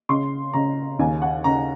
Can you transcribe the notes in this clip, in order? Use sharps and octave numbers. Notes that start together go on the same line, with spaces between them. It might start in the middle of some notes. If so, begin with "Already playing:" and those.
C#3 C6
C#3 A#5
D#2 G#5
F#5
C#3 A#5